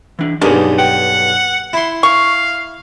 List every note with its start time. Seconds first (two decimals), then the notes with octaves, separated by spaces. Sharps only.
0.19 E3 D4
0.42 B1 G2 A#3 D4 D#4 G#4
0.78 F#5 G5
1.73 E4 C6
2.03 F5 C#6